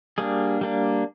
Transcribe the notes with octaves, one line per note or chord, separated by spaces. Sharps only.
G3 A#3 D4 G#4
G3 A#3 D4